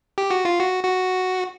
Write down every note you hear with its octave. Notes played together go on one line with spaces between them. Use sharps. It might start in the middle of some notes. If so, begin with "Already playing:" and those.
G4
F#4
F4
F#4
F#4